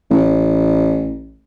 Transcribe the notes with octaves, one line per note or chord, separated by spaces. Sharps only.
A1